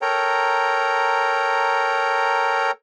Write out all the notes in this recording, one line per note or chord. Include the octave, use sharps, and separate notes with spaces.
A4 A#4 C#5 G5 A#5